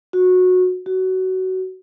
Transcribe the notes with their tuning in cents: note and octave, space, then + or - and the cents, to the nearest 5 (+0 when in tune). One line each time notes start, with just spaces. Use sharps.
F#4 -15
F#4 +20